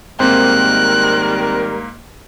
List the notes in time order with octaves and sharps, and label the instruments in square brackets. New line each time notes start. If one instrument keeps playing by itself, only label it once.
[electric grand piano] G#2 A#3 [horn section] D#3 G3 A#4 [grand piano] C4 [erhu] F#6